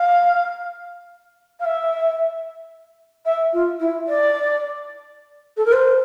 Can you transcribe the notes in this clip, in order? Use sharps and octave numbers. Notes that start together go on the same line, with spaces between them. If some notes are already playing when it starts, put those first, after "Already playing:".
Already playing: F5
F5
E5
E5
F4
E4
D5
A4
A#4
C5